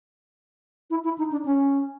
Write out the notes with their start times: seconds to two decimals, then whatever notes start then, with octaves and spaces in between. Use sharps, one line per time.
0.90 E4
1.04 E4
1.18 D#4
1.32 D4
1.45 C#4